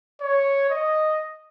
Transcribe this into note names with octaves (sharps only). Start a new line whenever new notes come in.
C#5
D#5